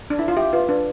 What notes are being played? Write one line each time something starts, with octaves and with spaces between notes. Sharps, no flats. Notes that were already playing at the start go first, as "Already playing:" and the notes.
D4
E4
F4
G4 E5
F4 B4
D4 B4